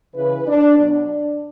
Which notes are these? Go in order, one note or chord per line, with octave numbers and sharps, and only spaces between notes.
C#3 E3 B4
D4
B2 F#3 D4